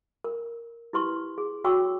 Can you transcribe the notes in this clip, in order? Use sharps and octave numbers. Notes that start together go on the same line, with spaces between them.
A#4
E4 G4 B4 C6 C#6
G#4
F#4 C#5 G5 C#6 D6 E6